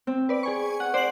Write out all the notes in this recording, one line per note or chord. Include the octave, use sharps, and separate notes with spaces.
C4
B4 D5
G#4 G#5 C#6
F#5
C5 D5 F#7